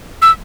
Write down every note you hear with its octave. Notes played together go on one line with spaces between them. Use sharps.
E6